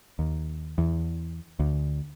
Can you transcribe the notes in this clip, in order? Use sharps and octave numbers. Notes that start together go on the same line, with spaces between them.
D#2
E2
D2